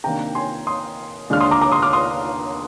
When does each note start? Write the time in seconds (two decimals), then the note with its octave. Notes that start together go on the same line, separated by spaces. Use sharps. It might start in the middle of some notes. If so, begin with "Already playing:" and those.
0.04 C2 C3 D#3 A#3 D4 G5 A#5
0.35 G#5 C6
0.67 C6 D#6
1.30 D#2 D3 G#3 D4 F6
1.40 C6 D#6
1.51 A#5 D6
1.61 A#5 D6
1.71 C6 D#6
1.82 D6 F6
1.93 C6 D#6